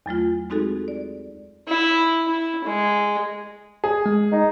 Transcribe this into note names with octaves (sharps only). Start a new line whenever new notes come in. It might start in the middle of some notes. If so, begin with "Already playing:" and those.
E2 F#3 A3 F4
G#3 C4 D#4 F#4 G#4 A4
D5
E4
E4
G#3
G#4
G#3
D#4